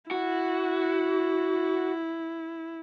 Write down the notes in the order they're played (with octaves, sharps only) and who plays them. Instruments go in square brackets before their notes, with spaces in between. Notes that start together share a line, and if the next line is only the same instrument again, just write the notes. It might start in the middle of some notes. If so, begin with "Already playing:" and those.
[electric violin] E4 [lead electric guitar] F#4